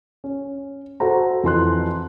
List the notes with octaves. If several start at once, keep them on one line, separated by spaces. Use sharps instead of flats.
C#4
F#4 A4 C5 A#5
F2 E3 C6 F#6